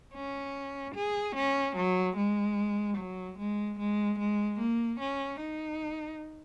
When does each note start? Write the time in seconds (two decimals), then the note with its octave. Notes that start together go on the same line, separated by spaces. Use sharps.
0.14 C#4
0.95 G#4
1.35 C#4
1.76 F#3
2.17 G#3
2.97 F#3
3.38 G#3
3.79 G#3
4.19 G#3
4.59 A#3
5.00 C#4
5.40 D#4